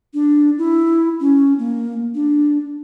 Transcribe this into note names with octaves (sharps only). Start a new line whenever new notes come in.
D4
E4
C#4
A#3
D4